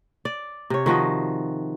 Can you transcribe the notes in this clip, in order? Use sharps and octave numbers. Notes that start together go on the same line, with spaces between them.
D5
C3 C#5
D#3 F3 F#4 D#5